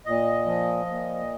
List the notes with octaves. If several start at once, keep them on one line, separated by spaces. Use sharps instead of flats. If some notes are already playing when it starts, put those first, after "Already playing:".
A#2 D#5
F3
A#2